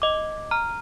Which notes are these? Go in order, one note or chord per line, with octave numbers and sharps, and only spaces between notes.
D#5 D6
A#5 F6